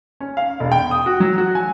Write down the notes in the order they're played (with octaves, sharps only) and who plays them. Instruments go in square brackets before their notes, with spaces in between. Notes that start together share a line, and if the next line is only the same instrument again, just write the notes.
[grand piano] C#4
F5
E1
G5
D#6
F#4
F#3
F#4
G#5